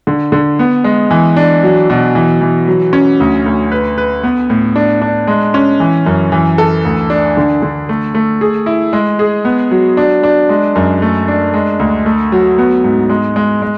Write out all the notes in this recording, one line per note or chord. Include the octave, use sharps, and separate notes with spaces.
D3
D3
B3
G#3
E3
D4
F#3
B2
E3
E3
F#3
C#4
D2
D2
B4
B4
B3
A2
D4
D4
G#3
C#4
E3
F#2
E3
A4
D2
D4
D3
D3
A3
A3
G#4
E4
G#3
G#4
B3
F#3
D4
D4
G#3
F#2
A3
D4
G#3
D2
A3
F#3
B3
G#2
G#3
G#3
G#3